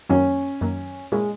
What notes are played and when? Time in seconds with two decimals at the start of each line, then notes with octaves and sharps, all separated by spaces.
0.09 F#2 D#3 F#3 A#3 C#4
0.61 F#2 D#3 F#3 A#3
1.12 A#2 G#3 A#3 C#4 E4